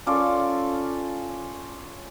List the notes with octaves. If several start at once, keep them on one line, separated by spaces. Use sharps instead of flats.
C#4 F4 A4 D5